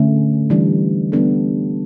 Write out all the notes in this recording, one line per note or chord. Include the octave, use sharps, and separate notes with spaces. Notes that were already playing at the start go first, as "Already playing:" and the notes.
Already playing: D3 A3 C#4
E3 G3 D4
G3 B3 D4 A4